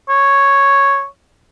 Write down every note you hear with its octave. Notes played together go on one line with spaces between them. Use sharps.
C#5